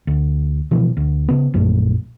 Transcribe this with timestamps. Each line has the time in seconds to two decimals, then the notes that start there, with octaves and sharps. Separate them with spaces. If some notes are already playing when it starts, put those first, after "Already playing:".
0.07 D2
0.71 B2 E3 F3
0.97 D2
1.29 C#3 B3
1.54 A#1 F#2 A#2 A3